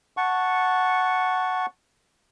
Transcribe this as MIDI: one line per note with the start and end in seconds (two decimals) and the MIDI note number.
0.17 1.66 78
0.17 1.66 81
0.17 1.66 85